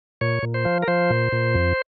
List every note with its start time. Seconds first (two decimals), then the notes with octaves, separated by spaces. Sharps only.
0.21 A#2 C#5
0.43 A#2
0.54 C5
0.65 F3
0.82 A#4
0.88 F3 C5
1.10 A#2
1.33 A#2
1.55 F2